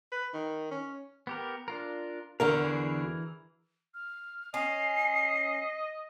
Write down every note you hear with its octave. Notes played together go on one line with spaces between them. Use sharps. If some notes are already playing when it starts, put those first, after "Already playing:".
B4
D#3
C#4
B3 G4 A#4
D4 F4 A#4
E2 D3 F#4 A#4 F5
E3 G#4
F6
C#4 D#5 C7